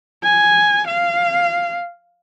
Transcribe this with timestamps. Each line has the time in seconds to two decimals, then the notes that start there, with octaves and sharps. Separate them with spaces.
0.23 G#5
0.87 F5